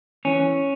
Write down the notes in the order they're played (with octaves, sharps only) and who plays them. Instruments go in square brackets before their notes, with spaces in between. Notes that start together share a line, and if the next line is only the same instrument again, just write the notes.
[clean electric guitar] E3 C#4